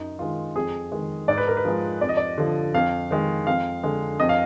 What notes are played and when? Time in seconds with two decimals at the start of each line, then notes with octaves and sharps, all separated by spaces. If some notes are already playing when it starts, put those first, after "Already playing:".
Already playing: F#2 D#4
0.19 D#3 G#3 F4
0.56 F2 G#4
0.92 D#3 G#3
1.28 G#2 D5
1.38 B4
1.47 A#4
1.57 B4
1.65 F3 G#3
2.01 F2 D5
2.09 D#5
2.17 D5
2.38 D3 F3
2.74 F2 F5
3.11 D#3 G#3
3.47 F2 F5
3.84 D3 G#3
4.20 F2 D#5
4.29 F5